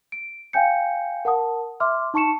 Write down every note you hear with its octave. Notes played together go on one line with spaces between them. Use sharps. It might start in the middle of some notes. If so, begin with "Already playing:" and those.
D7
F5 G5 G#5 G6 C#7
A#4 F#5 A5 D#6
E5 C6 D6 F6
D#4 A5 C#6 C#7 E7